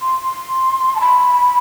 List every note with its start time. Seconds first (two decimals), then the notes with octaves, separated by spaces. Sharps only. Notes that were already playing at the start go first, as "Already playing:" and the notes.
0.01 C6
0.22 C6
0.95 A5
1.01 B5